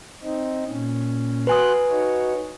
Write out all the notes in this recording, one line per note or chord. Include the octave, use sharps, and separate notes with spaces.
C4 D#4
A#2 C#4
F#4 B4 G#5 C6 D#6 F#6
D#4 F#4 C#5